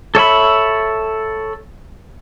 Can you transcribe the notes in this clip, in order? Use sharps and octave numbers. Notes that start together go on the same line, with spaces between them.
A4 C#5 E5 B5